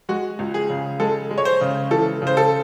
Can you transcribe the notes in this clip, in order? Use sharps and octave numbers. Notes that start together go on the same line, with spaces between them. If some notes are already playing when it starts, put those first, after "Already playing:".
G#3 F#4
C#2
G#4
C#3
G#3 A4
G#3
C#5
C5
C#3
E3 A4
C#3
C5
A4